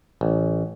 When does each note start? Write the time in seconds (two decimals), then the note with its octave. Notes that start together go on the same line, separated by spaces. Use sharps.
0.21 A1